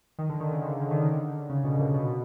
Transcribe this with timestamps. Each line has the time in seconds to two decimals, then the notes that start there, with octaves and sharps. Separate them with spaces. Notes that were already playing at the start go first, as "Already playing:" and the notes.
0.19 D#3
0.29 D3
0.40 D#3
0.51 C#3
0.62 D3
0.72 D#3
0.81 D3
0.91 D#3
1.01 D3
1.50 C#3
1.64 B2
1.79 A#2
1.94 B2